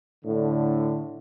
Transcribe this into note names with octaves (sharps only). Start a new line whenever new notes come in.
A2 D3